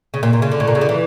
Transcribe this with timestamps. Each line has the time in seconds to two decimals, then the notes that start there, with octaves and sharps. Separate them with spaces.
0.14 C#3
0.23 A#2
0.33 A#2
0.42 C#3
0.52 D3
0.60 A2
0.68 A#2
0.75 C#3
0.81 D3
0.89 E3